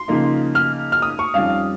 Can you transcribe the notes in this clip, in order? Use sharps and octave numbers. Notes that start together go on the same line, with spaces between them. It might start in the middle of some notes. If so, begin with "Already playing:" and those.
Already playing: C6
C#3 F3 A#3 D#4
F6
F6
D#6
C#6
F2 D#3 G3 C#4 F5